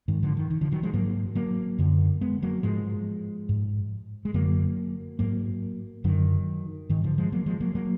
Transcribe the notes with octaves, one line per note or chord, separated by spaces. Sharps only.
G#2 D#3
D3 F3
D#3
D#3
D3 F3
D#3 F#3
F3 G#3
G#2 F#3 A#3
F#3 A#3
F#2 D3
G#3 B3
F#3 A#3
G#2 F3 G#3
G#2
G#3
F#2 D3 F#3 A#3
G#2 F#3 A#3
F#2 D3 D#3 F#3
G#2 D#3
D3 F3
F3 G#3
F#3 A#3
F3 G#3
F#3 A#3
F#3 A#3